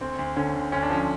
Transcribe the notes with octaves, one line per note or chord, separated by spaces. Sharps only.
D2 C4
D2
D3 C#4
D2
D2 C#4
D4
F3 C#4